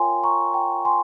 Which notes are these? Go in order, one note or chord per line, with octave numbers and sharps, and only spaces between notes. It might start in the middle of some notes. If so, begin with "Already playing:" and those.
Already playing: F4 A#4 C#5 F5 G5 G#5 A#5 C6
A#5 C#6
G5 A#5
G#5 C6